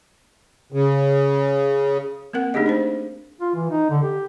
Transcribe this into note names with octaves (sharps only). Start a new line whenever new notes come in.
C#3
A#3 C4 A#4 F#5
A3 D4 D#4 G4 G#4 D#5
D4 D#4 C5
F4
E3
D#4
D3
G4